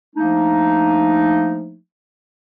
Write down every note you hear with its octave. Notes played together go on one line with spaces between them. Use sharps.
F3 A3 A#3 D4 D#4